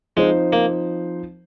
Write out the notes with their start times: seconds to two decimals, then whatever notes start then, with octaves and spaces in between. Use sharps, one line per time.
0.16 F3 G#3 C4 D#4 C5
0.53 A#3